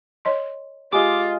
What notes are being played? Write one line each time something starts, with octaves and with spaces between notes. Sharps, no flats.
C#5 D#5 C6
G#3 F4 G4 D#5 D6